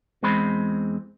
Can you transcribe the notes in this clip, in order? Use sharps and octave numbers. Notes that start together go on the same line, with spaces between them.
E2 G#3 C4 C5 B5